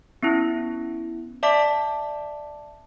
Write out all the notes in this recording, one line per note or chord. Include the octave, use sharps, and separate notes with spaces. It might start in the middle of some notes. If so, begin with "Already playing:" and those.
B3 C#4 E4
D5 E5 A5 D6 B6